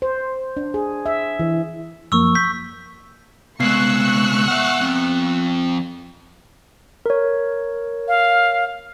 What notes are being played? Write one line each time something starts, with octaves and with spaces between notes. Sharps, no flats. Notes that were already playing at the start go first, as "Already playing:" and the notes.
C5
D4
G#4
E5
E3
F#2 F3 A#3 C#6 E6
G6 B6
C2 G#3 B3 C#6 E6 F#6 C7
E5 F#5
F3 C4
A#4 C#5
F5